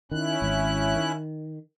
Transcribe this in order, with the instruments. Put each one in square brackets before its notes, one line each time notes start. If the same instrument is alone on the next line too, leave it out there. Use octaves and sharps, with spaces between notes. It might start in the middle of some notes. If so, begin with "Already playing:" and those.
[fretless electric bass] D#3 [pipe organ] C#4 E4 F#6
[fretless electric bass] G#1
D#3